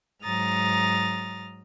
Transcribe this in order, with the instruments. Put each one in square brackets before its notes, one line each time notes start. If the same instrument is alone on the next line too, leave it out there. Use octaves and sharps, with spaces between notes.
[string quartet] G#2 F#3 A#5 D#6 F6 A6